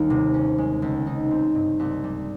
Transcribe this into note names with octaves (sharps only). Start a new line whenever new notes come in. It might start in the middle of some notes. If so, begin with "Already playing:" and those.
Already playing: D#2 G3 A#3
C3
C#4
G#3
C#2
D#4
C4
G2
C2
G3